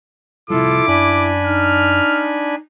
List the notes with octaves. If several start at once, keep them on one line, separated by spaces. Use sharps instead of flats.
C3 F3 G3 E4 F4 A4 D6
F#2 D4 G#5 B5
D#4 F6